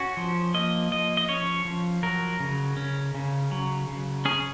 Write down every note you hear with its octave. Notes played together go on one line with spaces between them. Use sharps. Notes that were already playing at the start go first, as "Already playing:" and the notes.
Already playing: C#4 F#4
F3
A#3 D#5
F3 D#5
D#5
C#4 C#5
F3
F#3 A#4
C#3
C#4
C#3
F#3
C#3
C#4 G#4